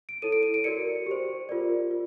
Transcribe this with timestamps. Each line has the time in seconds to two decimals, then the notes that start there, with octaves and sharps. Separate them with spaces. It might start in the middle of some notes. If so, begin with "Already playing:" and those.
0.09 D7
0.22 E4 A4 C#5 D#7
0.32 D7
0.43 D#7
0.54 D7
0.64 F#4 A#4 D5 C#7
1.06 G4 C5
1.49 F4 A#4 D5
1.91 F4